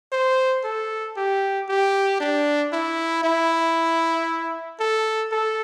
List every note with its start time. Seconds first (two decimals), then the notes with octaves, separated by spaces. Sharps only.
0.12 C5
0.64 A4
1.17 G4
1.69 G4
2.20 D4
2.73 E4
3.24 E4
4.80 A4
5.32 A4